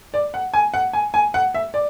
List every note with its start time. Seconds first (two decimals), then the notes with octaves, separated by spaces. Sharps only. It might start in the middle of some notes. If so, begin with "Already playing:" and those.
0.14 D5
0.34 F#5
0.54 G#5
0.74 F#5
0.93 G#5
1.14 G#5
1.34 F#5
1.54 E5
1.74 D5